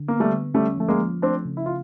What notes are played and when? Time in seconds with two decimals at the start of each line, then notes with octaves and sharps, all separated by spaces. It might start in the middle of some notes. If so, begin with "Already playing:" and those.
Already playing: D3
0.08 A#3 B3
0.20 G3 A3
0.32 D3
0.54 G3 A3 C#4
0.78 F3 A3
0.88 G#3 A#3
1.01 F3
1.22 A3 C4 D4
1.45 C#3
1.57 E4
1.66 F4